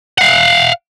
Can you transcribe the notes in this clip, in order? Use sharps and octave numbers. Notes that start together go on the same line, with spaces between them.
F5 F#5